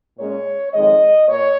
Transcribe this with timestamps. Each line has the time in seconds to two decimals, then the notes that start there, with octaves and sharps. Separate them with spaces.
0.17 A#2 G#3 C#4 C#5
0.73 F2 D#3 G#3 D#5
1.28 A#2 C#5